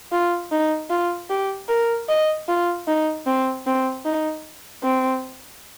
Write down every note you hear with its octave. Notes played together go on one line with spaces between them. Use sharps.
F4
D#4
F4
G4
A#4
D#5
F4
D#4
C4
C4
D#4
C4